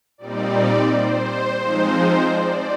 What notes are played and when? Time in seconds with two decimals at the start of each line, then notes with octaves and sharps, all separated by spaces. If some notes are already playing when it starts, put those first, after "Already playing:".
0.18 A#2 G3 C4 D#4 D5
0.88 C5
1.58 F3 G#3 C4 D#4 C5
2.28 D5